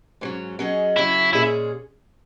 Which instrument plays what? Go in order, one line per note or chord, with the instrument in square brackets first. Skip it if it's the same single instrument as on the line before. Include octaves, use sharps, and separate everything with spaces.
[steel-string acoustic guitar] G#2 F#3 C#4
F#3 C#4 G#4 D#5
[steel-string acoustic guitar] C#3 F#3 C#4 [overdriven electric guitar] E4
[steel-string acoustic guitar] A#2 G#3 C#4 G#4 [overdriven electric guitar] E4